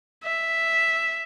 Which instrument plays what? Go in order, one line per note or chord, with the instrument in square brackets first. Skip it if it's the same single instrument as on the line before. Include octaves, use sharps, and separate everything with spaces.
[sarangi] E5